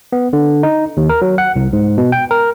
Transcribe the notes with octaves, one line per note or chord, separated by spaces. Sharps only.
B3
D3
D#4
D#2
A#4
F#3
F#5
C2
G#2
B2
G5
A#4